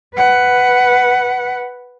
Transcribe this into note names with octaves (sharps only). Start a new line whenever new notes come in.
B4 F#5